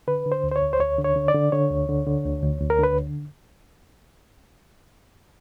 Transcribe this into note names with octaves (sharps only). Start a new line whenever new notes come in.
D3 B4
D3
C5
D2
C5
C#5
D2
C5
D2 C#5
D3
C#5
D3
D5
D3
D3 C#5
D2
D3
D3
D2
D2
D2
A#4
D3 B4